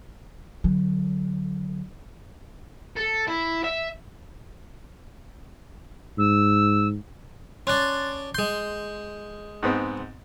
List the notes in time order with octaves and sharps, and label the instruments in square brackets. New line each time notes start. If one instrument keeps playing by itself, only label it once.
[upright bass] D3 F#3
[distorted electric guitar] A4
E4
E5
[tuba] G#2 [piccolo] E6
[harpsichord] C#4 D4 [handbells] C6 F#6 A6
[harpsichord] G#3 C6 [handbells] G6
[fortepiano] G#2 B3 C4